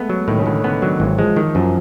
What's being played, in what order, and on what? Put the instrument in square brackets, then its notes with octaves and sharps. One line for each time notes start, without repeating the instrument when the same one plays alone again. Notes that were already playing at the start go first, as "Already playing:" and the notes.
Already playing: [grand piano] G#3 A3 [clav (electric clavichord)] B3
[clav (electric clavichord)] F#3
[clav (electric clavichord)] A2 [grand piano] D#3
[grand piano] C#3
[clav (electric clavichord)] A2 [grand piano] D3
[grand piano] D3 [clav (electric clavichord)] B3
[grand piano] D#3 [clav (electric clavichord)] F#3
[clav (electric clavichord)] G#1 [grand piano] E3
[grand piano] F3 [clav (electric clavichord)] G#3
[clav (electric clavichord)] D#3 [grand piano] F3
[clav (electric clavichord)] F#2 [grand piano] F3